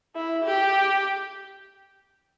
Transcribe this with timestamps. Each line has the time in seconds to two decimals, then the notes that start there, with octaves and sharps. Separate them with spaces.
0.16 E4
0.45 G4